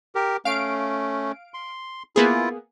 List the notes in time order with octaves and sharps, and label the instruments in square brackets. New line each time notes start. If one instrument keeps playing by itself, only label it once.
[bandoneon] G4 A#4
[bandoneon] A3 C#4 [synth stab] F5 D7
[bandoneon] C6
[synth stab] A#3 B3 G#4 [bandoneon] E4 F4